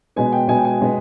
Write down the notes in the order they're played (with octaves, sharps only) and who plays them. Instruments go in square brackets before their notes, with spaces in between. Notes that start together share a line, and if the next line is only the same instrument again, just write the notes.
[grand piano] B2 G#3 B3 G#5
G5
B2 G#3 B3 G#5
G5
G#5
B2 G#3 B3